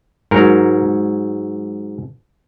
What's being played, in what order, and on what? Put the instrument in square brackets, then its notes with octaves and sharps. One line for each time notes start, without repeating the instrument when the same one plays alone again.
[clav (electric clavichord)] G#2 F#3 A#4